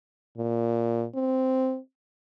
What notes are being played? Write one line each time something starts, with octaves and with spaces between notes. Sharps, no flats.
A#2
C4